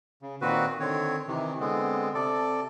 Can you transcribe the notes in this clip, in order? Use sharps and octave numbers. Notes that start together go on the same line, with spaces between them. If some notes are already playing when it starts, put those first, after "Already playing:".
C#3
A#2 D#3 C4 F#4 B4
D3 D#3 C4 C#5
C3 D#3 E3
D3 G#3 B3 C4
C3 A4 D5